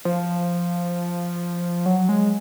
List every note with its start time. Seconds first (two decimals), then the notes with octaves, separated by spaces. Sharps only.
0.05 F3
1.86 F#3
2.09 G#3